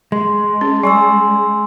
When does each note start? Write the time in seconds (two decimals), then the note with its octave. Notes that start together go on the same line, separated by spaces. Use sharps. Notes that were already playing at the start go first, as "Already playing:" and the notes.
0.12 G#3 C6
0.61 C#4
0.83 G3 G#5 C6 E6